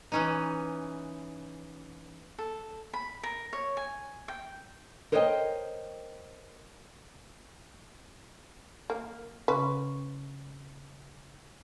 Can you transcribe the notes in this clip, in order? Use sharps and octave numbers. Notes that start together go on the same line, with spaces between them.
E3 C#4 D#4
A4
B5
A#4
C#5
G#5
G5
A#4 C5 C#5 D#5 E5 G5
A#3
C#3 C#4 B4 C6